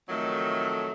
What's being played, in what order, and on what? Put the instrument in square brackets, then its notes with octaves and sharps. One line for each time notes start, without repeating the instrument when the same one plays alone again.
[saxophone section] F2 D#3 F#3 A3